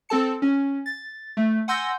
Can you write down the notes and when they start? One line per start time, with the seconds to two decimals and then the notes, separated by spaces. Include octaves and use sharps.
0.09 C4 A4 A5 C#7
0.42 C#4
0.86 A6
1.37 A3
1.68 F#5 G#5 C6 E6 G6 A#6